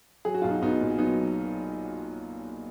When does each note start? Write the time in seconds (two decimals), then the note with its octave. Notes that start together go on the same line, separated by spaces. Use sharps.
0.25 F#3 G#4
0.34 F#4
0.42 B1 F4
0.50 D#4 F#4
0.62 B1 B3 D#4
0.81 A#2
0.98 F#3 B3 D#4